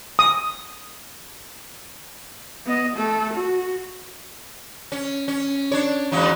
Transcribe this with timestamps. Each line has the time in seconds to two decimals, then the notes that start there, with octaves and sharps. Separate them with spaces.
0.19 D#6
2.66 B3 D#5
2.96 A3 A4
3.34 F#4
4.92 C#4
5.28 C#4
5.71 D4 C#5
6.12 E2 G#2 F#3